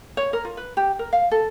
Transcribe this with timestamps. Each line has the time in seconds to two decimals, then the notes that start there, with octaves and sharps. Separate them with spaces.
0.17 C#5
0.33 A#4
0.45 F4
0.57 B4
0.77 G4
0.99 A#4
1.13 F5
1.31 A4